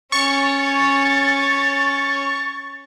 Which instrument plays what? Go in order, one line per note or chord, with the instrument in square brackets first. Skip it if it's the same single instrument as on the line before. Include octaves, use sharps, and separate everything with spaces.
[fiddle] C#4 C#5 [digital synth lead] C#6 [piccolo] A6